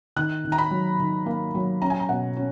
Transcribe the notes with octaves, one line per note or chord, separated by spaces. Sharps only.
D#3 F#6
D#3
A#5
B5
F#3
D#3
A#3
F#3
C#4 A#5
G#5
A#5
B2 F#5
C#4